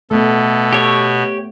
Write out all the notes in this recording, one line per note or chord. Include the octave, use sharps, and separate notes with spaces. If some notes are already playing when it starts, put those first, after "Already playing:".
B2 A3 B3 A4
G4 C#5